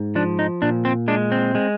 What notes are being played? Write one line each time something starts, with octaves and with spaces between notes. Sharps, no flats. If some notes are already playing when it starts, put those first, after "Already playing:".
Already playing: G#2
F3 D4
D#4
A#2 D4
C4
G#3 D4
C4
G#3